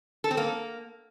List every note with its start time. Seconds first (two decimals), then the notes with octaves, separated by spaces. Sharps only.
0.24 A4
0.31 C4
0.37 A#3